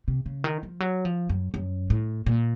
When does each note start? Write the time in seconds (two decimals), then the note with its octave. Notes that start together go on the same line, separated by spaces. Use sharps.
0.08 C3
0.26 C#3
0.44 D#3
0.63 F3
0.80 F#3
1.05 F3
1.29 F#2
1.54 F#2
1.90 A2
2.26 A#2